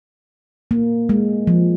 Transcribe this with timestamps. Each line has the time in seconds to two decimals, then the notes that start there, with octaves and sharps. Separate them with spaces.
0.71 A#3
1.09 G#3
1.47 F3